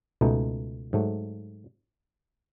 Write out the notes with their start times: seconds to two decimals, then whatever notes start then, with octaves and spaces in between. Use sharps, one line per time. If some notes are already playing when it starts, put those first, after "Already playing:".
0.21 C#2 B2 A3 D#4
0.93 G#2 F#3 A3